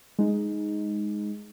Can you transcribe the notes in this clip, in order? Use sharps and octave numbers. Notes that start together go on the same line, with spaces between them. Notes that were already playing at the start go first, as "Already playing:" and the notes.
G#3 D#4